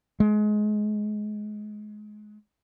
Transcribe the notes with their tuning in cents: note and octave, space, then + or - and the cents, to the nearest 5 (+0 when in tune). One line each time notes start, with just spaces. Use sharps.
G#3 +25